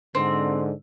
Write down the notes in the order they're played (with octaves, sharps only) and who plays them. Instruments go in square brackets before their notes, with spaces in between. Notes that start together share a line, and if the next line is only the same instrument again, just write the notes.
[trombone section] G#2 D3 [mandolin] C4